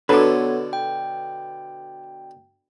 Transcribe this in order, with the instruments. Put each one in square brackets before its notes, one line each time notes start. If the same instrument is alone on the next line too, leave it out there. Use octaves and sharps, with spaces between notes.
[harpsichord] B2 D3 [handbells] B3 C#5 [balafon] D4 F#4 [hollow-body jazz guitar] A4 B4
[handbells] G5